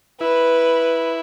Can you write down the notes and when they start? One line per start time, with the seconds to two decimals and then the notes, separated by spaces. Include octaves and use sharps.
0.21 E4 B4